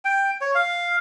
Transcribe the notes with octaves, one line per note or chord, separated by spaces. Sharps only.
G5
C#5
F5